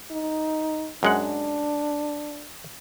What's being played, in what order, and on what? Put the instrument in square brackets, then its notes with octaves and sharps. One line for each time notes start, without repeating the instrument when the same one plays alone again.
[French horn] D#4
[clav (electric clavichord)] F#2 G#3 F#5 [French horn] D4